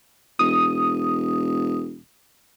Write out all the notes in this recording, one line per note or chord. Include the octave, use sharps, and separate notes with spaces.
E1 D#6